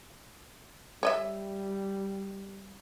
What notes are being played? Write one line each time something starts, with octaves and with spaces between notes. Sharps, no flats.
G3 C#5 D#5 E5